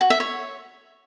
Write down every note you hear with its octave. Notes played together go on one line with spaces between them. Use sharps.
F#4
E5
C#5